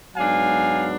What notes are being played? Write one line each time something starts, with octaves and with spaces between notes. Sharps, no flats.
G#2 F#3 B3 D4 F5 G#5